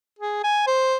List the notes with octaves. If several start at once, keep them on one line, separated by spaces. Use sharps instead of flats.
G#4
G#5
C5